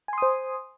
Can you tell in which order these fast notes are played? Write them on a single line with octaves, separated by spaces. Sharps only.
G#5 C6 D#6 C5